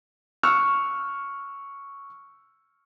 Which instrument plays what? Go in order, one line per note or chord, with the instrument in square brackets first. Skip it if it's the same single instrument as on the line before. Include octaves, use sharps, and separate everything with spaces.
[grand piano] C#6 E6 F6